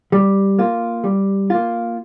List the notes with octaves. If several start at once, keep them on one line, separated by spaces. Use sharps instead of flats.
G3
A#3 F4
G3
A#3 F4